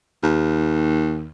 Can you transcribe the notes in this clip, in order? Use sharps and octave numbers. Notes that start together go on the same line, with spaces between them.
D#2